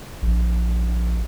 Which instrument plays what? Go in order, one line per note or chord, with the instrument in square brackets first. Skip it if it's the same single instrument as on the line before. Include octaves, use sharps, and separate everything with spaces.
[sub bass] A#1